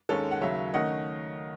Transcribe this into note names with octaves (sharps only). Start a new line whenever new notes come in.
D#2 D#3 G#3 C#4 A4 C#5
F#5
D#2 C#3 F#3 C#5 E5
D#3 A3 C#4 D#5 F#5